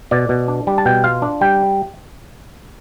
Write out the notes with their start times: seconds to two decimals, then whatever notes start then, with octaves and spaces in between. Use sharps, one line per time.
0.11 B2 D5
0.29 B2
0.48 D4
0.67 G3
0.78 A5
0.85 B2 G5
1.04 F4 F5
1.22 D4
1.41 G3 G5